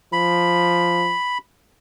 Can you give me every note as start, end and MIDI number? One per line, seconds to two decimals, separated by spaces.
0.13 1.15 53
0.13 1.38 83